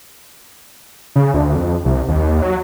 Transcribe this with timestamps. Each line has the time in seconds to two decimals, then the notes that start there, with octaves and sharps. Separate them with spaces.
1.16 C#3
1.34 D2
1.55 F2
1.85 C2
2.08 D#2
2.42 F#3